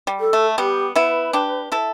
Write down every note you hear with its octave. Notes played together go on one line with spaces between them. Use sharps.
G3
A4
A3
G3 B3 G4
B3 E4 B4
D4 G4
E4 A4